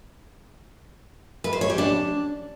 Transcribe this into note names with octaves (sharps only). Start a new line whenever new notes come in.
B4
C5
C#5
G4
D4